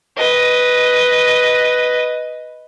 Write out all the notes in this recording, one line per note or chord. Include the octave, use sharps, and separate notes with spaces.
B4 D#5